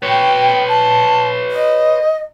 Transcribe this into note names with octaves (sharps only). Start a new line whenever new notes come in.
B4 C#5 G5
A5
D#5